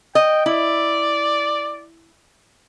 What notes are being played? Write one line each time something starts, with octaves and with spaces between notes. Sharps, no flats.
D#5 G5
E4 D5